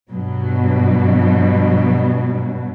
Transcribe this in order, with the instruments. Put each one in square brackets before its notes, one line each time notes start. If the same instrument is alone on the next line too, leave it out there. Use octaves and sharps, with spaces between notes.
[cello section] G2 B2 F#3